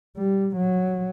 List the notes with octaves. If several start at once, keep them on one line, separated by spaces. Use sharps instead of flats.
G3
F#3